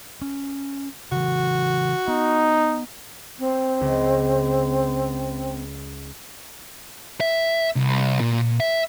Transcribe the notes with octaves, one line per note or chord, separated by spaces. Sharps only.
C#4
C#3 E3 F#4
B3 D#4
C4
C#2
E5
C2
A#2
E5